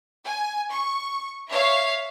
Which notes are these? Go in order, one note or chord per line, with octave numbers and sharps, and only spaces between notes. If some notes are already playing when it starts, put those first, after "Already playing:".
G#5
C#6
C#5 E5 F5